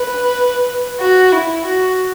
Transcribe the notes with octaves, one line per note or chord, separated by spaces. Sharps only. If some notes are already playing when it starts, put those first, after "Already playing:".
Already playing: B4
F#4
E4
F#4